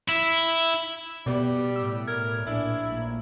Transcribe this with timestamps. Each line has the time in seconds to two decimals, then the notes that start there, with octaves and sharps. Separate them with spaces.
0.09 E4
1.26 B2 G3 B3 D5
1.76 A2 E6
2.08 A#4 G#6
2.47 A#1 D4 E4 G#4
2.87 A#1 A2 A#3